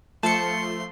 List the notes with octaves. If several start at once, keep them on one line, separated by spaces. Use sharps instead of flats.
F3 A3 A5 C6 C#7